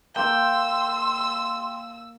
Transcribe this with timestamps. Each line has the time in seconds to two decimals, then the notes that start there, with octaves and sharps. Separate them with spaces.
0.16 A#3 G5 C6 D6 E6